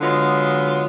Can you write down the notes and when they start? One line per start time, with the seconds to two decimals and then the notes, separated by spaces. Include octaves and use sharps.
0.01 D3 F#3 G#3 B3 F4